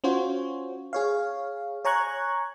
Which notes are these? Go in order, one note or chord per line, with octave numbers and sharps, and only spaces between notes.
C#4 F4 F#4 C5 C#5
G#4 C#5 F5
C#5 G#5 A#5 C#6 F#6 G#6